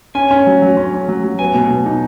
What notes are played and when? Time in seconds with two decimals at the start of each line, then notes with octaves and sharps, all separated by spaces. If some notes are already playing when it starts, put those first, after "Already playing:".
0.15 C#4 G#5
0.31 C#4
0.47 F#3
0.62 F#3
0.77 C#4
0.94 C#4
1.08 F#3
1.24 F#3
1.39 B3 G#5
1.55 B2
1.70 B2
1.86 D#4